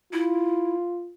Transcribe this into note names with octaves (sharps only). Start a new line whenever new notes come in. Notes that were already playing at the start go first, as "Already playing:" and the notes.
E4 F4